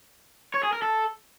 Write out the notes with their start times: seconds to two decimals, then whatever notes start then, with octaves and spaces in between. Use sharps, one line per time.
0.54 C#5
0.63 G#4
0.73 A#4
0.82 A4